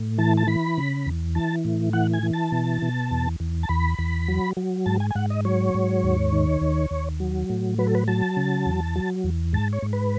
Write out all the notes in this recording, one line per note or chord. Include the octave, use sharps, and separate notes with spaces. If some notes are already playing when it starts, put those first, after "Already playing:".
Already playing: A2
E3 A5
A5
E3 B5
C#3
E2
E3 A5
A2
E3 F#5
G#5
E3
A5
B2
B2
E2
E2
A5
E2 B5
E2
F#3
F#3
G#2 A5
G#5
G#5
G#2 F#5
D#5
F#3 C#5
G#2
D#2
D#3
D#2
D#2
F#3
A2
F#3 B4
A4
B4
F#3 A5
C#3
E2
F#3
E2
G#2 A5
C#5
G#2
B4